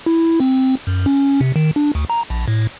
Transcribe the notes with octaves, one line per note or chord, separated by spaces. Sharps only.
E4
C4
F#2
C#4
C3
D#3
D4
D2
A#5
A#1
A2